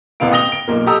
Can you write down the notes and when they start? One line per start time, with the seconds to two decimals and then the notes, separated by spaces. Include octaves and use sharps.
0.20 E1 A1 C3 B3 F5 D7
0.32 G5 D#6 A#6 F7 G7
0.52 D7
0.68 B1 A#2 A#4
0.87 G4 A4 D#5 A#5 D#6 E6